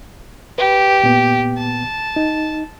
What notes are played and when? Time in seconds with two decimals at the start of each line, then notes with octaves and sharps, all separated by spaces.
0.58 G4 B4
1.03 A#2 B3
1.58 A5
2.16 D#4